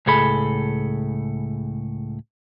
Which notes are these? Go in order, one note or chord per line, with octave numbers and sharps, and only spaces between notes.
C#2 A2 G#4 A4 B5